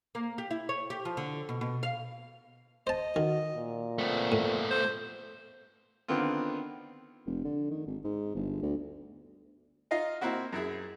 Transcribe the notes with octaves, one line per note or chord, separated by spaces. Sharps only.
A#3
G4
E4
C#5
G4
F3
D3
B2
B2
F5
C5 D#5 A5
D#3 F#4
A#2
A3 B3 C4
A2
C5
D3 D#3 B3 C4 F4
F1
D3
D#3
G#1
G#2
G1
D2
D#4 F4 D#5 F5
A#3 C4 E4 F#4
F#2 E4 G#4